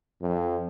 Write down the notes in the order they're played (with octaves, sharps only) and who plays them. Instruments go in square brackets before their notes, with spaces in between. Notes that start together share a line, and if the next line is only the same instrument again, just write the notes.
[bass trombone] F2